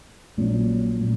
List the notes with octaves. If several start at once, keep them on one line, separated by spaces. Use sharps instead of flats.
A#1 A#2 F#3 C#4
A#2 F#3